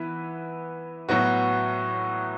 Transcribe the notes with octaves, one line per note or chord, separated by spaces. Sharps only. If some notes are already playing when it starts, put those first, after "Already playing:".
Already playing: E3 B3 E4 B4
A2 F#3 B3 F#4